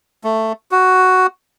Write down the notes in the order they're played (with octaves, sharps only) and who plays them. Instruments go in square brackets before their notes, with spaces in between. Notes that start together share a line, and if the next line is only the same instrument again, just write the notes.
[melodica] A3
F#4